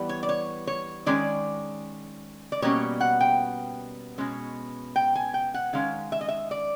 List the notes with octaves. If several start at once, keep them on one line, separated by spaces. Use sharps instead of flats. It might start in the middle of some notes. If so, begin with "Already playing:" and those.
Already playing: E3 G3 B3
C#5
D5
C#5
C#5
D#3 G#3 C#4 D5
D5
B2 G3 A#3 C#4 C#5
F#5
G5
B2 G#3 C#4
G5
G#5
G5
F#5
D#3 G#3 C#4 F5
E5
D#5
E5
D5